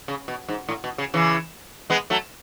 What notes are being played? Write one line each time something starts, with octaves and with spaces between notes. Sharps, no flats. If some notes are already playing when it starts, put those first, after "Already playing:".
C#3
B2
G#2
A2
B2
C#3
C#3 E3
G#3 B3
F#3 A3